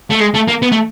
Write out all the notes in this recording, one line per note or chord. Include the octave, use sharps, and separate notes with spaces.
A3
G#3
A3
A#3
B3
A3